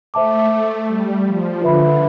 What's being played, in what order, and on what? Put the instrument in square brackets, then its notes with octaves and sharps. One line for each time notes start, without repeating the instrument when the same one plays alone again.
[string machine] A3 [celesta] C5 E5 A5 D6
[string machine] A3
G3
F3
[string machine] D3 [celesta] F4 B4 E5 B5